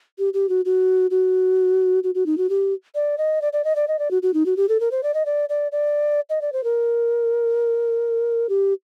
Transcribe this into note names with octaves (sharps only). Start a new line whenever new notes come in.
G4
G4
F#4
F#4
F#4
F#4
F#4
D#4
F#4
G4
D5
D#5
D5
D5
D#5
D5
D#5
D5
F#4
F#4
D#4
F#4
G4
A4
A#4
C5
D5
D#5
D5
D5
D5
D#5
D5
C5
A#4
G4